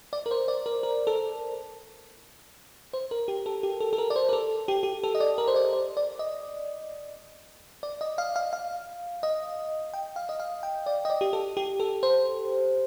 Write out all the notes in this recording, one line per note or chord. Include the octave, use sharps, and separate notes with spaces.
D5
A#4
C5
D5
A#4
A#4
A4
C5
A#4
G4
A4
G4
A4
A4
A#4
D5
C5
A#4
A4
G4
G4
A4
D#5
D5
A#4
C5
D5
C5
D5
D#5
D5
D#5
F5
F5
F5
D#5
G5
F5
D#5
F5
G5
D5
D#5
D5
G4
A4
G4
A4
C5